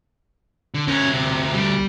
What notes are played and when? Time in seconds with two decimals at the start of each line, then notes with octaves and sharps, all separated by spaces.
0.74 D3
0.88 D2 C#4 A#4
1.12 C3
1.54 G3